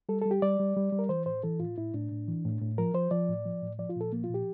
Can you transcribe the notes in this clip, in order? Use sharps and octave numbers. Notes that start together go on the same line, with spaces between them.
G3 A4
G3 A4
G4
G3 D5
G3
G3
G3
A#4
E3 C5
A2 C5
E3 A4
A2 F4
A2 E4
A2 D4
A2
E3
A2
A2
F3 A#4
F3 C5
F3 D5
A2
F3
A2
F3 D5
F4
A#2 A4
F3 A#3
F4
A#2
G4